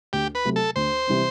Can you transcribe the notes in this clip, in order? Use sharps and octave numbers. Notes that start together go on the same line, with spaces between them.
D2 G4
B4
C3 F#3 A3
A4
D2 C5
C3 E3 G3 C4